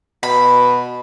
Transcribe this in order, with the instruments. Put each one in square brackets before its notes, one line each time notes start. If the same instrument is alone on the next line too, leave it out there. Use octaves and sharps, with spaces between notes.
[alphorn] B2 [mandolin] B5